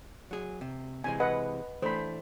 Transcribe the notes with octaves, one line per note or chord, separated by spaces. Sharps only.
F#3 G#4
C3
C3 E3 G#3 G#5
B4 D#5 F#5
E3 A3 D4 C5 B5